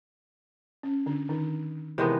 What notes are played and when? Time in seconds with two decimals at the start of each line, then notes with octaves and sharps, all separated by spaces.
0.83 C#4
1.06 D3 D4
1.29 D#3 D#4
1.98 C3 D#3 E3 G#3 B3 E4